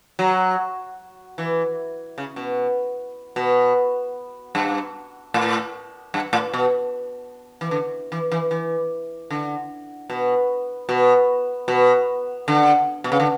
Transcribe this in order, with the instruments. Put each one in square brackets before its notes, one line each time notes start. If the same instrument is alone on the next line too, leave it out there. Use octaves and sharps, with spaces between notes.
[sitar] F#3
E3
C#3
B2
B2
G2
A2
G2
A2
B2
E3
D3
E3
E3
E3
D3
B2
B2
B2
D3
B2
C#3
D3